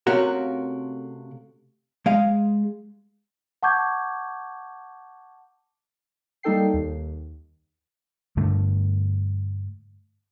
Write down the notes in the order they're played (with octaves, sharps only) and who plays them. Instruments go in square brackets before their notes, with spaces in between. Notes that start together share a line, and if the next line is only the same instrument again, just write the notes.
[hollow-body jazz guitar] C3 A3 C#4 F4 F#4 A#4
G#3 D#5 F5
[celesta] F#5 A5 C#6 D6 G6 G#6
[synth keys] G3 A#3 D#4 A4 G5 C7
D#2
[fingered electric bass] G2 D3 A3